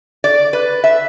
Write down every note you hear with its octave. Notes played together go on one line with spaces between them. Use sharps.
D5
B4
E5